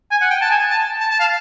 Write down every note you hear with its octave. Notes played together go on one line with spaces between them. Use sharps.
G#5
F#5
G5
A5
G#5
A5
A5
A5
F5